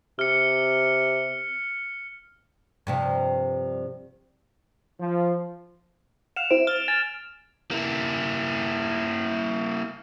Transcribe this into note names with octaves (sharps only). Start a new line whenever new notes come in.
C3 F6 C#7
G2 C3 F3
F3
F5 F#5 E7 F7
C4 E4 D7
F6 A6
G#5 A6
A#3 E4